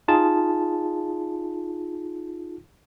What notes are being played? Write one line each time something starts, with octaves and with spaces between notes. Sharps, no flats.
D#4 F4 G#4 A5